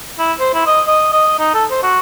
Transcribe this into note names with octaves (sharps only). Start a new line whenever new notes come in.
E4
C5
E4
D#5
D#5
D#5
D#4
A4
C5
F#4